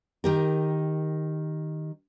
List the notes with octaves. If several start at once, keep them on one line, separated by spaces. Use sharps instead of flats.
D#3 G4 A#4